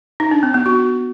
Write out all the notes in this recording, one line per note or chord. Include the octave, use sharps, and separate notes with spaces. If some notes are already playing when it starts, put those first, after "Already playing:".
D#4
D4
C4
B3
F#4